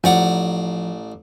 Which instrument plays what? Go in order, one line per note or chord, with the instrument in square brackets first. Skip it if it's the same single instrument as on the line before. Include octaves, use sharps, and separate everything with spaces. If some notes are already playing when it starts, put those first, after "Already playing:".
[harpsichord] A1 D5 A#5 [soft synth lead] F3 [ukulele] F#5 G#5